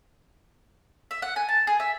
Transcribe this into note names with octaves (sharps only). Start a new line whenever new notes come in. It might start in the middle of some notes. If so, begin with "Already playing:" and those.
E5
F#5
G#5
A5
G#4
E5